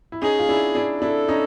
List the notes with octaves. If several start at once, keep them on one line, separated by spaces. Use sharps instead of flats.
E4
C#4 D#4 G#4
F4
D4 E4
D4 E4
D4 E4 A4
C#4 D#4